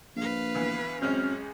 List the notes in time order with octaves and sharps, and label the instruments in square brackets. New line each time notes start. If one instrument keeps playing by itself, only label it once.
[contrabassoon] A#1 [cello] B4 F5
[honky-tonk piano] D2 E3 B3
[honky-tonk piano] A1 G#3 G6 [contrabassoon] F#2 [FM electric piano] C4 F6 [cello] C#4